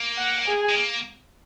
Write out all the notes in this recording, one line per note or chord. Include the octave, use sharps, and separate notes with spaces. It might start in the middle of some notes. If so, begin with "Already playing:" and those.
Already playing: A#3
F#5
G#4
G#3
A#3